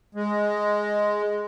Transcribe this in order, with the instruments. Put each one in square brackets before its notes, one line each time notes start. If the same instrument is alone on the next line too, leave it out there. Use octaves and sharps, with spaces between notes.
[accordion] G#3